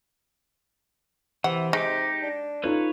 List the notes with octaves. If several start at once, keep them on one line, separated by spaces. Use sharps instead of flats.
C3 E3 F#5
G#3 D#4 G4 D6
D4
D#4 F4 A4 B4 C#5